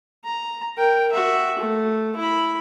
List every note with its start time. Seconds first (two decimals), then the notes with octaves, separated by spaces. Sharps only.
0.24 A#5
0.78 A#4 G5
1.12 F#4 E5
1.59 A3
2.16 E4 B5